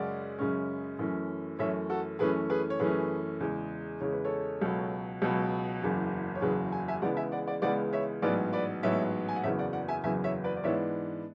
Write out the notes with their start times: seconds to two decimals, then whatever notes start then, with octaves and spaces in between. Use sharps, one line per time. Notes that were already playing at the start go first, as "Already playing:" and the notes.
Already playing: F#2 C#3 G#3 C#4 D5 F#5
0.39 F#2 C#3 G#3 C#4
0.99 F#2 E3 A3 C#4
1.59 F#2 E3 A3 C#4 C#5 E5
1.89 F#4 A4
2.19 F#2 E3 A3 C#4 G#4 B4
2.50 G#4 B4
2.70 C#5
2.79 F#2 E3 A3 C#4 G#4 B4
3.40 E2 C#3 G#3
4.01 E2 C#3 G#3 C#5
4.12 B4
4.25 A4 C#5
4.62 C#2 B2 F#3
5.22 C#2 B2 F#3
5.81 F#1 E2 C#3 F#3
6.35 C#5
6.41 F#1 E2 C#3 F#3 G#4 B4
6.72 G#5
6.88 E5 G#5
7.02 C#2 C#3 E3 G#3 B3 D5 F#5
7.17 E5 G#5
7.32 D5 F#5
7.47 D5 F#5
7.62 C#2 C#3 E3 G#3 B3 D5 F#5
7.93 C#5 E5
8.22 A1 G#2 F#3 B3 B4 D5
8.53 B4 D5
8.83 A1 G#2 F#3 B3 C#5 E5
9.29 G#5
9.36 F#5
9.43 F#1 E2 C#3 F#3 B3 C#5 E5
9.59 D5 F#5
9.73 D5 F#5
9.88 E5 G#5
10.04 F#1 E2 C#3 F#3 B3 E5 G#5
10.24 C#5 E5
10.44 B4 D5
10.57 D5
10.64 G#2 E3 B3 D4 C#5 E5